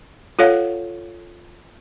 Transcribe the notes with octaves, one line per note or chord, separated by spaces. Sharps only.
F4 A4 C#5 F5 F#5